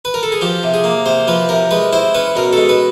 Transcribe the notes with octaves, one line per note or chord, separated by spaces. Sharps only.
B4
A#4
A4
G#4
F3 G4
C3
G#4
A#3
C3 C5
F3 B4
C3 A#4
G#3 B4
E4 C5
C#4 B4
B2 A#4
G#3 A4
B4